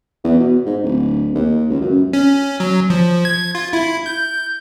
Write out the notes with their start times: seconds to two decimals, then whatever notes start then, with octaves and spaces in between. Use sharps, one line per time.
0.24 E2
0.40 B2
0.66 G#2
0.84 D1
1.35 D#2
1.70 C#2
1.81 F#2
2.13 C#4
2.60 F#3
2.90 F3
3.25 G#6
3.55 F4
3.73 E4
4.06 G6